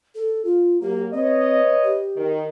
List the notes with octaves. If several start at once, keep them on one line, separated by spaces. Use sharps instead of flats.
A4
F4
F#3 A#3 G4
C4 B4 C#5 D#5
G4
D#3